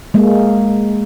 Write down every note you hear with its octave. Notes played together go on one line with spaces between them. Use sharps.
G#3 A#3